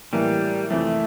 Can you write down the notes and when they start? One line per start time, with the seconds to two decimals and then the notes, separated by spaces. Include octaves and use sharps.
0.13 A2 E3 G3 A#3
0.70 F2 C3 E3 A3